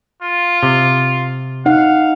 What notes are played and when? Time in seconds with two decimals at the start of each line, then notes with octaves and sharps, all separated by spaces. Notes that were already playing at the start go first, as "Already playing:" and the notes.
0.22 F4
0.63 C3
1.66 D#4 F5 F#5